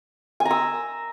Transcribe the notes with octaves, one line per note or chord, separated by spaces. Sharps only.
G#5
A#5
E6